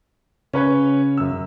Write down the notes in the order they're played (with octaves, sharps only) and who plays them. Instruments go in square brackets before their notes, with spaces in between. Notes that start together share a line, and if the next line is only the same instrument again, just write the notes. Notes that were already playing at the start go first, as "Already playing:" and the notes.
[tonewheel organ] C#3 [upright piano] C#4 B4 C#5
[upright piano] F#2 E6